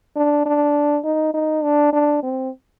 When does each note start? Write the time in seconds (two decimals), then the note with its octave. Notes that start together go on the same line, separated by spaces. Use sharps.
0.16 D4
0.45 D4
1.04 D#4
1.34 D#4
1.64 D4
1.93 D4
2.23 C4